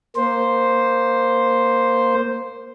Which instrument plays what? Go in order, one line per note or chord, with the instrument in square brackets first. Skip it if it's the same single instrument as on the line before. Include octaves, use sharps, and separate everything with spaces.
[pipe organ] A#3 C5